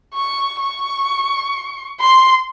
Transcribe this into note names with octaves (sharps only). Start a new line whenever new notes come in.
C#6
C#6
C6